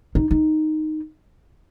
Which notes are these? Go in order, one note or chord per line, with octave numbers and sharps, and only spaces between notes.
D#4
D#4